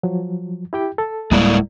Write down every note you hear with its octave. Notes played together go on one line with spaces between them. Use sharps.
F3 F#3
E4 G4 G5
A4
D1 G3 G#3 A#3 E4 D5